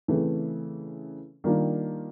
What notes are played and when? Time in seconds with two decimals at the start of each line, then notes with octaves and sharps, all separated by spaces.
0.08 C#3 E3 A3 C4
1.44 D#3 G3 A#3 D4 F4